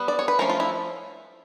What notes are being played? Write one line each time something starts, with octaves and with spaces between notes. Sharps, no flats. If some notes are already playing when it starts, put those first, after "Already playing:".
Already playing: G3 B3
D5
C#5
B4
F3 A3 C#4 A#4
F4
E4